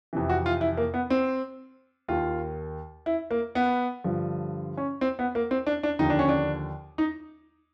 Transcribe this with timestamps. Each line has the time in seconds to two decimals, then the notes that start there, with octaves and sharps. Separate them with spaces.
0.13 F2 C3 E3
0.29 F#4
0.46 F4
0.61 E4
0.77 A#3
0.94 B3
1.10 C4
2.08 D#2 D#3 F4
3.06 E4
3.31 A#3
3.55 B3
4.04 G2 D3 F3
4.77 C#4
5.01 C4
5.19 B3
5.35 A#3
5.51 C4
5.67 D4
5.83 D4
5.99 D#2 D3 F3 D#4
6.10 D4
6.19 C#4
6.29 D4
6.98 D#4